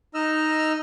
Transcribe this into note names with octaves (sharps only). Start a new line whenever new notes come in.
D#4 D#5 E6 F6